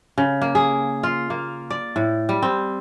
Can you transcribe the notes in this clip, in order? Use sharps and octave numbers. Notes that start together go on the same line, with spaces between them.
C#3
A#3
G#4
F4
A#3
D5
A2
G3
C4